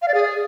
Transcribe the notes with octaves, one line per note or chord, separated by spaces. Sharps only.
F5
D5
G#4